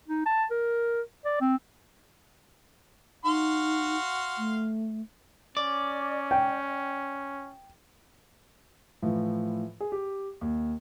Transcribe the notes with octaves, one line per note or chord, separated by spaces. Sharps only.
D#4
A5
A#4
D5
C4
D#4 F#4 F5 C6
A3
C#4 D5
G5
A2 E3 F3
G#4
G4
D#2